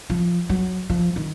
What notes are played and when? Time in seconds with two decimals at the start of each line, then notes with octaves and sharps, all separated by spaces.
0.10 F3
0.49 F#3
0.90 F3
1.16 D#3